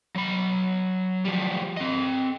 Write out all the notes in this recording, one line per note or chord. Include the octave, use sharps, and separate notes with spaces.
F#3 B5
F3 G3
C4 D#5